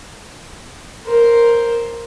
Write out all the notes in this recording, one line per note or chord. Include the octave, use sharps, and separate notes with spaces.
A#4 C5